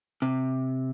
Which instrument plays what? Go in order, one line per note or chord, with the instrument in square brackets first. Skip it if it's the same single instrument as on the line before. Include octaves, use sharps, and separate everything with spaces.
[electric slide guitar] C3